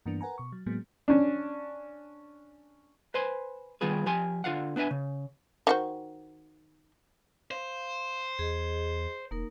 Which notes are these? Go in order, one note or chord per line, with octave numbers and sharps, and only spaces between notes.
G2 E3 A#3 B3 D4
A#4 B4 F#5 G#5 A#5
B2 C#6
F#3
A2 F#3 G#3 A#3 B3
C#4 D4
B4 C5 G#5 C6
D#3 G3 B3 F4 G#4 B4
F3 G4 G#5 C6
D3 F4 F5 F#5
B3 D4 B4 E5 G#5
C#3
D#3 F#4 C5
C5 F5
E2 G#4 D#5
E1 A#3 D#4 A#4